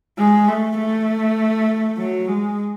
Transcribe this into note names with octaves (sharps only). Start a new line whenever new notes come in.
G#3
A3
A3
F#3
G#3